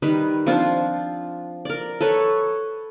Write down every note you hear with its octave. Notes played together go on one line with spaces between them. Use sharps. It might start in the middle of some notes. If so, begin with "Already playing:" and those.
D#3 G3 B4
F3 C4 D4 F4
A#4 D5
A4 B4 C#5 C#6